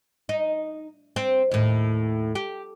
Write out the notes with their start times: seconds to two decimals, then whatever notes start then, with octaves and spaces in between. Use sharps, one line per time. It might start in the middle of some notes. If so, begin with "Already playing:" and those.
0.29 D#4
1.16 C4
1.51 D#2 A2
2.35 G4